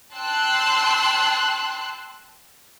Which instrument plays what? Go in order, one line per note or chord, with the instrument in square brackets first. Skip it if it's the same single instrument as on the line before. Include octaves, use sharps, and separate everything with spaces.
[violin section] G5 A5 C6 E6 F#6